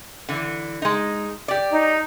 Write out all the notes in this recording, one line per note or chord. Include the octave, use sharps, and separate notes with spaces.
D3 E3
G#3 D#4
G4 D5
D#4